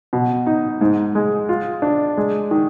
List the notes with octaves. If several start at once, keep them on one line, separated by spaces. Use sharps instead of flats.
B2
D#4
G#2
G#3
F4
D4
G#3
D#3